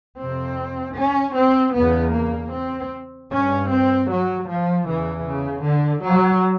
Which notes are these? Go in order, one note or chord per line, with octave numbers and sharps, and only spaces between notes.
F2 C3 C4
C#4
C4
E2 C#3 B3
A#3
C4
G2 C#4
C4
F#3
F3
E2 C#3 E3
C#3
D3
F#3